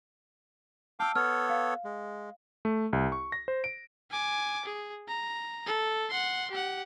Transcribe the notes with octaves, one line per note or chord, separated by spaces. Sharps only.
F5 G5 A5 D6 E6
B3 A4 C#5 F6
F5
G#3
A3
C2
C#6
A#6
C5
D7
G#5 D6
G#4
A#5
A4
F#5 C6
G4 F#5